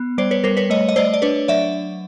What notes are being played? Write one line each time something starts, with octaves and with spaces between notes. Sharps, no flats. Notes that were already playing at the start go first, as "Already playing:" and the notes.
Already playing: B3
G3 C5 D5
B4 C#5
G3 A#4 C5
B4 C#5
A3 C#5 D#5
D#5
A3 C5 D5
D5
D4 B4 C#5
F#3 D5 E5